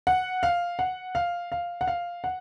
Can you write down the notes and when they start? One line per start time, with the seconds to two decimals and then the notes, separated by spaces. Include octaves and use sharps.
0.07 F#5
0.43 F5
0.79 F#5
1.15 F5
1.52 F5
1.81 F#5
1.87 F5
2.24 F#5